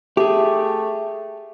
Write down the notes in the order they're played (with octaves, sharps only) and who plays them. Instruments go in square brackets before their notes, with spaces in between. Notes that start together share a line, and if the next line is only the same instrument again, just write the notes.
[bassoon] A3 [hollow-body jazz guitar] G4 G#4